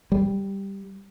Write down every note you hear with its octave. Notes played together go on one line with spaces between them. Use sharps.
G3